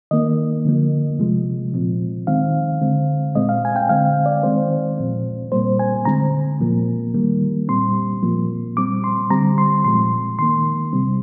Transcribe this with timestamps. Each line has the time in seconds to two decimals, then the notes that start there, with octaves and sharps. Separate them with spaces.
0.11 D#3 A#3 D#5
0.65 D3 F3 A#3
1.19 C3 F3 G#3
1.73 A#2 F3 C4
2.27 D#3 G#3 C4 F5
2.81 D3 G#3 C4
3.35 A#2 G#3 C4 D#5
3.49 F5
3.65 G#5
3.76 G5
3.89 D3 G#3 C4 F5
4.26 D5
4.43 D#3 G#3 C4 C5
4.98 A#2 F3 C4
5.52 A#2 G3 A#3 C5
5.80 G#5
6.05 D3 G#3 C4 A#5
6.60 A#2 F3 A#3
7.14 D#3 G3 A#3
7.68 A#2 G3 C4 C6
8.23 A#2 F3 A#3
8.77 A#2 G3 C4 D6
9.04 C6
9.30 D3 G3 C4 A#5
9.58 C6
9.85 A#2 F3 G#3 C6
10.39 D#3 A#3 C6
10.93 C3 G3 C4